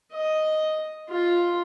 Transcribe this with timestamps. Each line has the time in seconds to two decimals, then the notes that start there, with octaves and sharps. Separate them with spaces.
0.13 D#5
1.09 F4